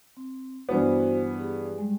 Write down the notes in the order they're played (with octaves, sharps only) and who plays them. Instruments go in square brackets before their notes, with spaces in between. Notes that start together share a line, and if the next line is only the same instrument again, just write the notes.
[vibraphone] C4
[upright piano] G2 E3 B3 [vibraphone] F#4 C5
[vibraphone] G4 G#4
G3 G#3